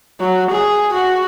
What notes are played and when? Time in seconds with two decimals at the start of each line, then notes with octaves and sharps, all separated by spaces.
0.20 F#3
0.51 G#4
0.94 F#4